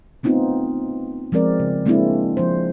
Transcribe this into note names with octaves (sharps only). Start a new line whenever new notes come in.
A3 B3 C4 D#4 F4
F3 G#3 C4 A#4 D5
C#3
G#3 A#3 C4 D4 E4
F3 C5